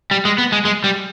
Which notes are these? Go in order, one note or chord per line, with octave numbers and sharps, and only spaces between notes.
G3
G#3
B3
G#3
G#3
G3